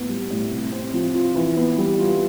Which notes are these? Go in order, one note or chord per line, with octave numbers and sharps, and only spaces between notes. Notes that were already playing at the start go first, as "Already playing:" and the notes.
Already playing: A2 B3
G3
A2
C3
C4
F3
F4
E3
B3
G3
F4